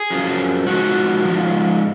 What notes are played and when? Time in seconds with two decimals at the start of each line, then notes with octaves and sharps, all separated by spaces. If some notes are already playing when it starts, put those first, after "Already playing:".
Already playing: G#4
0.11 F#2 F3
0.67 G#2 F3 F#4
1.25 G#2 F3